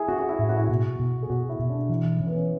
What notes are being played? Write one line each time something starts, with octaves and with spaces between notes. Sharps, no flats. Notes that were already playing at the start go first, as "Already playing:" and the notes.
Already playing: E4 G#4
C#4 F#4
F#4
E4
A2
F#4
E4
B2 F#4
B2
G#4
B2 F#4
E4
B2
D4
E3 E4
E3 C#4
B3
C#4